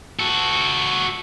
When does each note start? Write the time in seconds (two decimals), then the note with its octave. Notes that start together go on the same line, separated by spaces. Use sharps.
0.19 F#4 A4